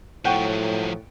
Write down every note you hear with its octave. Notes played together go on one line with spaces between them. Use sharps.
A2 F3 F#3 F#5 G5 C#6